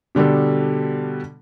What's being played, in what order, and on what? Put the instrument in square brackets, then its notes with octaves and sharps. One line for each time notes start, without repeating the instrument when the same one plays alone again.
[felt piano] B2 D3 G3 D4 A4